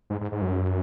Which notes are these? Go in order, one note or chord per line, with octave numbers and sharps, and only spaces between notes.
G#2
G#2
G#2
F#2